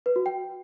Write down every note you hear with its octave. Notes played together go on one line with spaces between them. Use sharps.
B4
F#4
G5